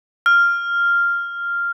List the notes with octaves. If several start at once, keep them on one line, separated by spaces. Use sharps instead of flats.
F6